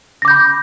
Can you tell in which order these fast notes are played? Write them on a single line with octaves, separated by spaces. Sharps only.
A#6 D6 G6 B5